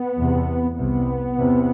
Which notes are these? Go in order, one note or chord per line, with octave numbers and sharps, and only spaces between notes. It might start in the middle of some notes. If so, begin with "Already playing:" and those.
Already playing: B3
E2 C3
C2 C3 B3
E2 C3